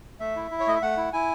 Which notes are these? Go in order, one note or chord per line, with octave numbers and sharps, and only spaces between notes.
A3 E5
E4
E4
C#5
A3 D#5
E5
A3 F#5
E4
E4 G#5